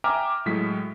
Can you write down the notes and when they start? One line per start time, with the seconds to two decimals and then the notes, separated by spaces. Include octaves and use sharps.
0.04 E5 G5 G#5 A#5 D6 F6
0.46 A2 F#3 G#3 B6